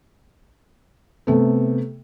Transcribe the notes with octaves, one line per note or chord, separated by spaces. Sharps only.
C3 A3 B3